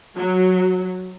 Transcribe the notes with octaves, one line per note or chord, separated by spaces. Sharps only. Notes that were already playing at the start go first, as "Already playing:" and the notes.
F#3